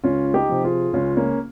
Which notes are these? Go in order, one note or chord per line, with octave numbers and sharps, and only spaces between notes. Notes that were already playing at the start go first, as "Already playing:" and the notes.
C#2 C#4 F4
D#4 G4
C3 F3
F4 G#4
C#2 C#4 F4
A#3 C#4